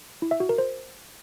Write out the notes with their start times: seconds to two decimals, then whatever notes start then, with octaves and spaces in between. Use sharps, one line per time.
0.22 E4
0.31 E5
0.40 F#4
0.49 A#4
0.58 C5